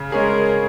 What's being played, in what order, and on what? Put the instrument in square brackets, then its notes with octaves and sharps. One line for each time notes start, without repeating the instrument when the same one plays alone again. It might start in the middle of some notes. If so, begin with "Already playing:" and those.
Already playing: [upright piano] C#3
[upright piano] G#3 C#4 G#4 [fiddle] A#4